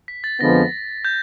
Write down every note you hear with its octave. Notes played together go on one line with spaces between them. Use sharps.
B6
A6
F2 D3 F3 G#3 B3 A#6
G6